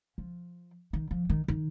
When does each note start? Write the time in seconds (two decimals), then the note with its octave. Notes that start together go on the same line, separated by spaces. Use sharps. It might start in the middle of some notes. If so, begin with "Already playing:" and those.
0.18 F3
0.93 D#3
1.11 F3
1.30 D#3
1.48 D#3